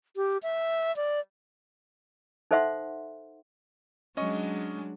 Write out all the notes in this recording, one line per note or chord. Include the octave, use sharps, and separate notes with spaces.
G4
E5
D5
D#4 A4 C5 E5 F#5 C6
F#3 G#3 C#4 D4 D#5 C#6